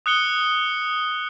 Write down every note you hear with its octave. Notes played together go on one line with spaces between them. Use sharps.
D#6 F#6 C#7 G7